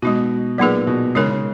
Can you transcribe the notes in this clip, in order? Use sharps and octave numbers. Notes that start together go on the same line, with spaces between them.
B2 G#3 D#4 F#4
A#2 F#3 B3 D#4 G#4 B4
B2
C#3 G#3 D#4 A#4
C#3